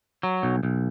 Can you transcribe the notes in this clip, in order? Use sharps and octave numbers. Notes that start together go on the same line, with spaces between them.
F#3
B1
B1